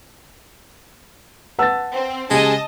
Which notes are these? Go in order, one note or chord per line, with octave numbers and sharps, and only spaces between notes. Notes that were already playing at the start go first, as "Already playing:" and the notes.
B4 F#5 A5 E6 A6
C4
C#3 G#3 G4 D#5 G#5 A5